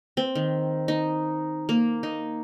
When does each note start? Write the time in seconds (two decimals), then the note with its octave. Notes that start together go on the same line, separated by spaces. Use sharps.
0.17 C4
0.35 D#3
0.88 D#4
1.69 A#3
2.03 D#4